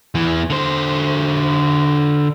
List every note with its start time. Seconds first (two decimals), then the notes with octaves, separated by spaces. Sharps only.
0.15 E2 E3
0.50 D3 C5